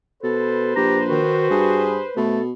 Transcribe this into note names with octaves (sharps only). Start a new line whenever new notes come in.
B2 A4 B4 C5
A#1 G4 A#5
D#3 F#4
G2 G#4
B2 A3 A4